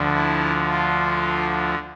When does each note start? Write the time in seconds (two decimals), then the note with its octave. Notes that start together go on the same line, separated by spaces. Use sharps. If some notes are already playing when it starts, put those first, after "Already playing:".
Already playing: D2 D3 F3
0.14 E4
0.69 F4